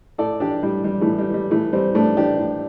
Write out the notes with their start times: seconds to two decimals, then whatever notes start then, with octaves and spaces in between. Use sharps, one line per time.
0.18 A2 A4 D5
0.40 E3 D4 G4
0.63 A2 G3
0.84 E3 G3
1.01 E3 A3
1.07 A2
1.18 G3
1.29 E3 G3
1.51 A2 E3 A3
1.72 E3 G3 C4
1.94 A2 A3 D4
2.17 E3 D4 G4
2.39 A2